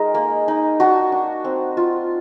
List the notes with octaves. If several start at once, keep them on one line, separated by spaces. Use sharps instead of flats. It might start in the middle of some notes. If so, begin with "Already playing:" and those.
Already playing: G#3 D#4 A#4
A#3
D#4
D4 F#4
D4
C4
F4